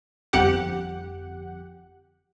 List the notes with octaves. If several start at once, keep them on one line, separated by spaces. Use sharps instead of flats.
G1 F2 G4 F#5